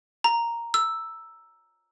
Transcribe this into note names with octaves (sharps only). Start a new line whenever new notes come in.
A#5
E6